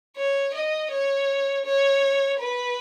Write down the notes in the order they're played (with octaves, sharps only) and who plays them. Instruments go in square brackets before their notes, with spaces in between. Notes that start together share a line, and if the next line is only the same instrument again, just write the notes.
[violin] C#5
D#5
C#5
C#5
B4